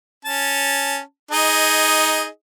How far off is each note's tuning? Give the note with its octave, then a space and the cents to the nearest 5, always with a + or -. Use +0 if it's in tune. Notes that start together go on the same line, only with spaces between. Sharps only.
C#4 +0 A5 +0
D#4 +15 G#4 +0 D#5 +0